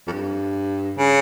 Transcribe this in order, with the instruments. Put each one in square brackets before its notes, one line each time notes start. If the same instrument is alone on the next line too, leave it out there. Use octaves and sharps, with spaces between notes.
[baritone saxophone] F2
G2
C#3